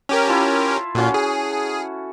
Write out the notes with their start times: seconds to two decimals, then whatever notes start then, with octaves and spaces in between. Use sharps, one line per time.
0.09 C#4 G4 A#4
0.27 E4 F4 A5
0.95 A#2 C#4 F4 F#4 A4
1.14 G#4